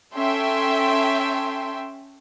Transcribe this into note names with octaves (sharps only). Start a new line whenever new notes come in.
C#4 A4 E5 G5 C6